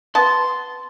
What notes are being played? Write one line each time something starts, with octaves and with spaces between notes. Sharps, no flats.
B3 A5 C6